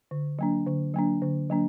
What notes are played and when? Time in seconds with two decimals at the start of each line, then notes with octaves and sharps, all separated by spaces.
0.11 D3
0.39 F#3 A#3 D4
0.66 D3
0.94 F#3 A#3 D4
1.22 D3
1.50 F#3 A#3 D4